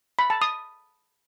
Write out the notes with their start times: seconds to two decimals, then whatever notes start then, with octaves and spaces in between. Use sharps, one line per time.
0.19 B5
0.30 A5
0.42 D#6